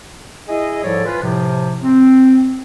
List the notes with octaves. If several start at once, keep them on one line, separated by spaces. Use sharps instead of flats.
E4 G#4 D#5
G#2 F3 G3 A4 C#5 D5
E3 F4 B4
A2 C3 F3
C4